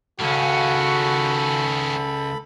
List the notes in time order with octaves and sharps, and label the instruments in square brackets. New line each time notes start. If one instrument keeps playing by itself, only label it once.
[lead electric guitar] C#2 [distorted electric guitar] D#3 C#4 [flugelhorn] F#4 [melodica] A4 B5